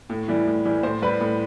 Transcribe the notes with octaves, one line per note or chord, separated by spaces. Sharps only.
A2
E3 G3
A2
E3 G3
A2 C5
G3 B4
A2